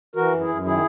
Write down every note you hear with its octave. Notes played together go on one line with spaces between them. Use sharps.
E3 F#4 A#4
F#2
E4 G#4
F#2
D#3 E4 G#4